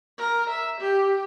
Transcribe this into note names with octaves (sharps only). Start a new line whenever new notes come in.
A#4
E5
G4